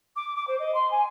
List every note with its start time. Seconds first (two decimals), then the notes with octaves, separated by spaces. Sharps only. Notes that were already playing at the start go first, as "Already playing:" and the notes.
0.16 D6
0.36 D6
0.47 C5
0.59 D#5
0.74 C6
0.91 G#5